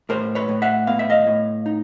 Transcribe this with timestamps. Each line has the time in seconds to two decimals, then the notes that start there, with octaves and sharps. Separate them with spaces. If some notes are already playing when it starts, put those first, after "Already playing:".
0.09 A2 A#4 C5
0.35 B4 C#5
0.49 A2
0.62 E5 F#5
0.87 B3 F5
0.99 E5
1.10 D#5 F5
1.27 A2
1.66 D#4